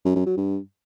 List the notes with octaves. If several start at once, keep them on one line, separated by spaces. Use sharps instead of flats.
F#2
F#2
F#3
G2